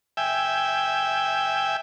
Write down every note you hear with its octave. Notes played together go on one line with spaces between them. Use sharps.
E5 G5 G#5